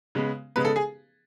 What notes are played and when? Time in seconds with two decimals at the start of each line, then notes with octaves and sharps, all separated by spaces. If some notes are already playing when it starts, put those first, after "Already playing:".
0.15 C#3 G#3 B3
0.56 C#3 G#3 B3 B4
0.65 A4
0.76 G#4